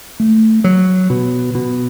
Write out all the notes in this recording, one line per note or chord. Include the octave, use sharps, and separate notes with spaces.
A3
F#3
B2
B2